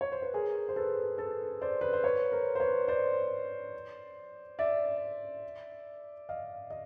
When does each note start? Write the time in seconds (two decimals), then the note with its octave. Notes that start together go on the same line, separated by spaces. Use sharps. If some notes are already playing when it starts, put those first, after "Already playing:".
0.01 C#5
0.12 C5
0.22 B4
0.34 G#4 A#4
0.69 C5
0.76 A4 B4
1.18 A4 B4
1.61 C5 D5
1.81 B4
1.93 C5
2.04 B4 C#5
2.32 A#4 C5
2.55 C5
2.60 B4 C#5
2.88 C5 D5
4.59 D5 E5
6.29 D#5 F5
6.70 D#5